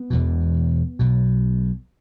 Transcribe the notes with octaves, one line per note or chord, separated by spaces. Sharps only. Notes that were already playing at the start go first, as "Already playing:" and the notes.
Already playing: B3
E1 E2 B2
B1 B2